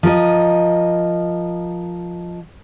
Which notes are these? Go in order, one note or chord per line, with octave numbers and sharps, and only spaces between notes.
F3 A#4 D#5